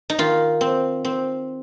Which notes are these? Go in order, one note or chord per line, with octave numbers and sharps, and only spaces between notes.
D#4
D#3 F4
C4
C4